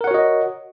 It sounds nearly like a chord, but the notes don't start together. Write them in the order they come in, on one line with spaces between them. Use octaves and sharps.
A#4 F#5 C#5 F#4 D#5